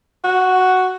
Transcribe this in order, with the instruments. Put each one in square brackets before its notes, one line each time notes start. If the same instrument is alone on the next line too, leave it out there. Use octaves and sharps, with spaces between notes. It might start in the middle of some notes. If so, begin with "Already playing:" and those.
[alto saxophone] F#4